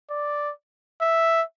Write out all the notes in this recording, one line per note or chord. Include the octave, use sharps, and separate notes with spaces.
D5
E5